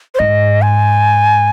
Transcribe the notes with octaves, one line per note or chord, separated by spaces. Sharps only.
C5
G#2 D#5
G#5